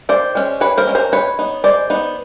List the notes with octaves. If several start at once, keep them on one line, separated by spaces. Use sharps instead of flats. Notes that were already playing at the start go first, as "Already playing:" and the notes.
D#3 C5 D5
G#3 C#4
D#3 B4 C#5
A#4 C5
G#3 C#4
A#4 C5
G#3 B4 C#5
B3 D#4
G#3 C5 D5
B3 D#4